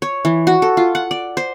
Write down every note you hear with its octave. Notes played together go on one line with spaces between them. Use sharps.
C#5
E3
F#4
A4
F4
F#5
D5
C5